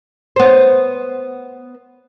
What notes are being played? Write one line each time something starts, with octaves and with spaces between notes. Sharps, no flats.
B3 C5